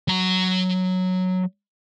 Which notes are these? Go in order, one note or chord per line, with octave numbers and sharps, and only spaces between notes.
F#3 A#5